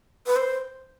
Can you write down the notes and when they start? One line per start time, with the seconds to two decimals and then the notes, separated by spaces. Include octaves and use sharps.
0.27 B4
0.36 C5